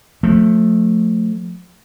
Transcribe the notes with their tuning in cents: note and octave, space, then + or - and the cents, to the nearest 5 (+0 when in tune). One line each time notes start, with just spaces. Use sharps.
F3 +30 A3 +0